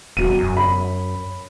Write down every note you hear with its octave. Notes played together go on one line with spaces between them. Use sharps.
E1 F#3 D#7
F#2
B5